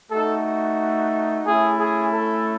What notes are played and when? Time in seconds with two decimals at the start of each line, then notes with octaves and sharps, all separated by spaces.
0.11 A3 D#4 F#4 A4
1.45 A3 C#4 E4 G#4
1.78 G#4
2.12 A4